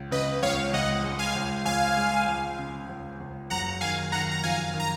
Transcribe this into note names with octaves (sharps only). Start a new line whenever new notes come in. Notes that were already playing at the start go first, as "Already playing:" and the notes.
Already playing: C#2
C#3 B4 D#5
C#2 C#5 F5
C#2 D#5 F#5
G#3
F5 G#5
C#2
C#2 F5 G#5
G#3
C#2
C#3
C#2
C#2
F#1 F#5 A#5
D#3 F5 G#5
D#3 F#5 A#5
A#5
F2 F5 G#5
D#3
A#5